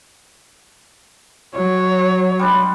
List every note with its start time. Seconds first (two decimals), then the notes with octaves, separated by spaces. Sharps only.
1.56 F#3 C#5
2.39 G3 G#3 D4